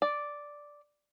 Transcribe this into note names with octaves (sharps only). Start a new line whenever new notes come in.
D5